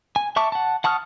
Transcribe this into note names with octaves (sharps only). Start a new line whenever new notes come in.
G#5
E5 A5 C#6 D6
F#5 A5
F#5 A5 C#6 D#6 F6